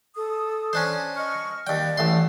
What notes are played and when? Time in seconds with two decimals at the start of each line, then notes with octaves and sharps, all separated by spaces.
0.15 A4 D#6
0.73 C#4 D4 C5
1.16 D#5 C#6 F6
1.67 D#2 D5 G5
1.98 A1 A2 C6